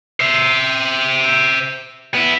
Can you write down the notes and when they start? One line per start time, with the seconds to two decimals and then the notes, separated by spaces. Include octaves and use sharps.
0.20 C5 E5
2.14 B3 E4